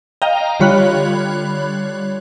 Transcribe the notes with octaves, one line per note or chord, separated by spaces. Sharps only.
D#5 F5 G5 A#5
D3 G3 F4 C#5 B5 F#6